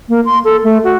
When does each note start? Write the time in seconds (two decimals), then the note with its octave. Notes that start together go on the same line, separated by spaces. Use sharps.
0.09 A#3
0.25 C6
0.45 A4
0.64 A3
0.84 F#4